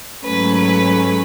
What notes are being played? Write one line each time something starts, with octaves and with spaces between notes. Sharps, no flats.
G#2 F#3 A3 C#4 B4
B4